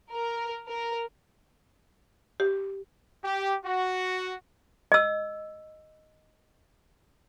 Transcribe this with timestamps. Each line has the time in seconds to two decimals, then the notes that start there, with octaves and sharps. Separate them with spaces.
0.11 A#4
0.69 A#4
2.40 G4
3.24 G4
3.65 F#4
4.92 D#5 E6